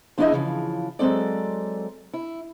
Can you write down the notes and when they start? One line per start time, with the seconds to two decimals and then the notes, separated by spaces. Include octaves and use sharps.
0.18 F3 D4 E4 G#4 D#5 E5
0.32 C#3 E3 F3
0.99 F#3 G#3 C4 A4 D5
2.14 E4